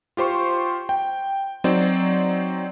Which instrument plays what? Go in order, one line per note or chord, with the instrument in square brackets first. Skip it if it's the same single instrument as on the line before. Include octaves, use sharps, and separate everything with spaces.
[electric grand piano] F4 G4 C5 C6 C#6
G5
F#3 C4 D#4 C5 D5